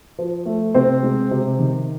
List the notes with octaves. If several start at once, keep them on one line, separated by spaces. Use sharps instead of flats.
F3
A3
C3 C4 C5
G#3
C3
D#3